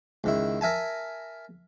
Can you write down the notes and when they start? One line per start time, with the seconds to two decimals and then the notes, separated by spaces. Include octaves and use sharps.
0.24 C#2 D#3 E4
0.61 A#4 E5 G#5 A5